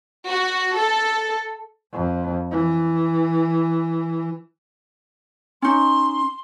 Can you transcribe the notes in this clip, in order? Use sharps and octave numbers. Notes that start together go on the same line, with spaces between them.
F#4
A4
F2
E3
C#4 D#4 C6